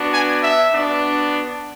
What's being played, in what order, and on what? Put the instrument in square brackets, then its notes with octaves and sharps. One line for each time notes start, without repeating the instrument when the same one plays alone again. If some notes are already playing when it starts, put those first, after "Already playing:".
Already playing: [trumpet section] B3 D4 F#4
G#5
E5
B3 D4 F#4